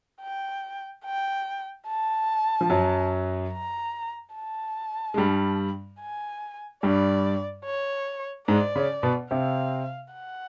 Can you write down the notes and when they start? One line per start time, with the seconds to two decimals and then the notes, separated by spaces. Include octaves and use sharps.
0.22 G5
1.05 G5
1.87 A5
2.61 F3
2.70 F#2 F#3
3.53 A#5
4.35 A5
5.14 G#3
5.18 G2 G3
6.01 G#5
6.83 G2 G3 D5
7.65 C#5
8.48 G#2 G#3 D5
8.76 C#3 C#4
9.03 B2 B3
9.31 C3 C4 F5
10.14 F#5